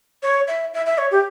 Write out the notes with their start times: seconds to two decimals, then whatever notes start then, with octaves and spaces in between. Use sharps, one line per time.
0.23 C#5
0.48 E5
0.74 E5
0.86 E5
0.98 C#5
1.11 G4